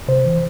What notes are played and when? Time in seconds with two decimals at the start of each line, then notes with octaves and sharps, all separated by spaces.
0.08 C3 C5
0.26 E3